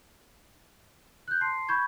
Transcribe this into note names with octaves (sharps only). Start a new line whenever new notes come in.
F#6 G6
A5 C6 C7
B5 C#6 G6 G#6